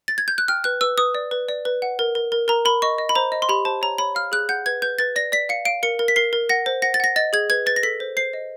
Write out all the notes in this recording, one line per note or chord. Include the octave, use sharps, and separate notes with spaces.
A6
G#6
G6
F#6
G5 F6
B4 F#6
B4 E6
B4 D#6
D5
B4
D5
B4
F#5
A#4
A#4
A#4
A#4 A#5
A#4 B5
D#5 C#6
D#5
B5
C5 A#5
D#5
C6
G4 B5
C5 A5
C#5 A#5
C#5 B5
F5 F6
G#4 F#6
F#5 G6
B4 G#6
B4 G6
B4 A6
D5 A#6
D5 B6
F5 C#7
F5 D7
A#4 C#7
A#4
B6
A#4 C7
A#4
F#5 A#6
C5
F#5 A#6
A6
F#5 A#6
D#5 A6
G#4 G#6
B4 G#6
B4 A6
A#6
A4 B6
C5
C5 C7
D#5